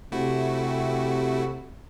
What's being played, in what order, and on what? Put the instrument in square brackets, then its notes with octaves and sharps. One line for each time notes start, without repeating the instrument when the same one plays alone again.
[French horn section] C3 [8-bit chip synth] A3 E4 F#4